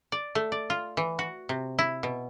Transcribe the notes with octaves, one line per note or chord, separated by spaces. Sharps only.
D5
A3
D5
F4
E3
F#4
C3
E4
B2